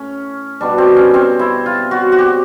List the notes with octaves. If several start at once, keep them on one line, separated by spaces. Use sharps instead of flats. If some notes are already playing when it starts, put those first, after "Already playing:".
Already playing: A2 C#4
B2 G3 D4
C4
C#4
C4
E4
F4
F#4
F#4
G4